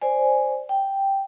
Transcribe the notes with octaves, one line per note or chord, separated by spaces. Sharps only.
C5 D5 G#5
G5